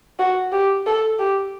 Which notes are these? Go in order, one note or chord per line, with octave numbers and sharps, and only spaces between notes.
F#4
G4
A4
G4